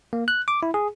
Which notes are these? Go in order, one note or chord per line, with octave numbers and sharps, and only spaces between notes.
A#3
F#6
D6
E4
G#4